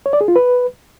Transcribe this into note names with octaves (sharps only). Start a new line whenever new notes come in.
C#5
D5
G#4
F4
B4